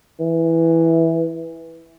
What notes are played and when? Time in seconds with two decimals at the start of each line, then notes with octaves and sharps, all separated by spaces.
0.20 E3